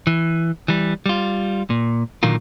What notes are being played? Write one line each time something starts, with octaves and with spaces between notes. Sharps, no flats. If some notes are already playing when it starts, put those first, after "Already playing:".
E3
E3 G3
G3 F4
A#2
A#2 D3 D#3 F#3 A#3 F4